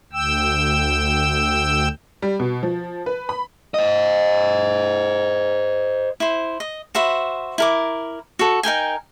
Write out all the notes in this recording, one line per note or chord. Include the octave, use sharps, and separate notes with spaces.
D2 G5 E6
G3
B2
F3
B4
B5
C5 D#5
E4 C5
D#5
F#4 C5 E5 B5
E4 A#4 D6
F#4 A4
D#4 A#4 G5 G#5